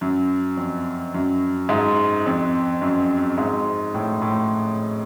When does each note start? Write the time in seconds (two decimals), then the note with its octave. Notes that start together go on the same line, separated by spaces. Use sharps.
0.01 F#2
0.57 F2
1.14 F#2
1.69 G#2
2.26 F2
2.82 F#2
3.38 G#2
3.94 A2
4.22 A2